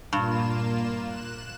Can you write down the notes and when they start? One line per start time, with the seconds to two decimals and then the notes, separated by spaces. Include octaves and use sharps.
0.13 G2 A#2 A#3 F4 E7
1.02 F#6 E7